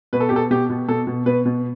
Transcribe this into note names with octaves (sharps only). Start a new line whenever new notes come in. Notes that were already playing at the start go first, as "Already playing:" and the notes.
B2 B4
A4
G4
B2 A4
B2 G4
B2
B2 A4
B2
B2 B4
B2